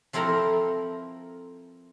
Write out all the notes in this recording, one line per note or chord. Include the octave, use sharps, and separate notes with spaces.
F3 C4 E4 A4 A#4 A#5